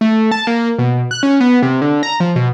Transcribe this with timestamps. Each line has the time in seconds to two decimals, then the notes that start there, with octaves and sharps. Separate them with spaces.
0.01 A3
0.31 A5
0.47 A#3
0.79 B2
1.11 F#6
1.23 C#4
1.41 B3
1.63 C3
1.82 D3
2.03 A#5
2.20 F3
2.36 B2